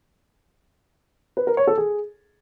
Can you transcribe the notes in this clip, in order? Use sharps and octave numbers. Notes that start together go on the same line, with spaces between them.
B4
A#4
C#5
A4
G#4